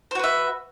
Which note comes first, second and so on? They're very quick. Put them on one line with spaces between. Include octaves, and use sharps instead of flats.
C5 F#4 B4 E5